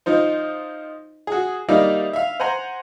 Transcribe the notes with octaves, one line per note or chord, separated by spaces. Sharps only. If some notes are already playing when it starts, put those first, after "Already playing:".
F3 D#4 C5
F#4 G#4
G3 A#3 D#4 D5 E5 F5
E5 F5
C5 F#5 G#5 A#5 C6